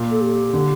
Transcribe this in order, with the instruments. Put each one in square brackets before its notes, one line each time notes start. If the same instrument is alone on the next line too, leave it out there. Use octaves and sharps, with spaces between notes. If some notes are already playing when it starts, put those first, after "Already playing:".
Already playing: [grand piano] A#2
[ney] A4
G4
[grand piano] D3